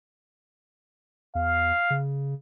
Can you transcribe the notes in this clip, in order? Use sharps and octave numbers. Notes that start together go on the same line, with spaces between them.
E2 F5
C#3